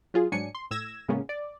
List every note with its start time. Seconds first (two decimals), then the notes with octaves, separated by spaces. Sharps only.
0.14 F#3 F4 G#4
0.32 G#2 F#3 D4 G#5 C#7
0.55 C6
0.71 A2 E6 G#6 A#6 E7
1.08 A2 C#3 G#3 A#3 B3 C#4
1.29 D5